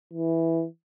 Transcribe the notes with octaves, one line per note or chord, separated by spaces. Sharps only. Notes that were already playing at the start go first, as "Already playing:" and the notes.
E3